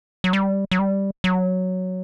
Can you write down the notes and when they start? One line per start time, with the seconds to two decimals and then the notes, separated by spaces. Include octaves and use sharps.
0.24 F#3
0.33 G3
0.71 F#3
0.79 G3
1.24 F#3